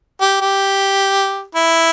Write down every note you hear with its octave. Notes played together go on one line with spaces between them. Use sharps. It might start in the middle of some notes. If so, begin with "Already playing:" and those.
G4
G4
E4